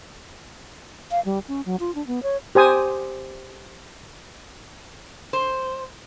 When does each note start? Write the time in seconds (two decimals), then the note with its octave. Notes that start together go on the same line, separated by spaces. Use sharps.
1.11 F5
1.25 G3
1.48 C#4
1.66 F#3
1.80 F4
1.95 D4
2.07 B3
2.23 C#5
2.55 G4 C5 G#5 D#6
5.33 C5